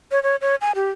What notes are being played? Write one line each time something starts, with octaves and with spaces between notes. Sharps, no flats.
C#5
C#5
C#5
G#5
G4